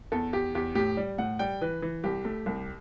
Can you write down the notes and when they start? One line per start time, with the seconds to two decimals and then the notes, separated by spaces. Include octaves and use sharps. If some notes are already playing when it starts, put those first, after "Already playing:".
0.12 E2 A4
0.33 E2 G4
0.55 E2 G4
0.75 A2 G4
0.97 G3
1.18 A2 F#5
1.39 G3 G5
1.61 E3 B4
1.82 E3
2.04 C2 G4
2.25 A3
2.46 C2